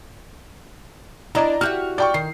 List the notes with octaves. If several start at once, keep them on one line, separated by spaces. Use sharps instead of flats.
D4 E4 D5 D#5 A#5
F#4 G4 E5 F6
D5 G5 C#6
D#3 C7